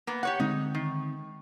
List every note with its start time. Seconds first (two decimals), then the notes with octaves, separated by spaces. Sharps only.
0.07 A#3 B3
0.23 G4 C#5 F#5
0.40 D3 G#3 C4 D#4
0.75 D#3